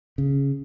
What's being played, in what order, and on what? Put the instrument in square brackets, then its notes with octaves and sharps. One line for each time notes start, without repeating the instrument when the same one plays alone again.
[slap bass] C#3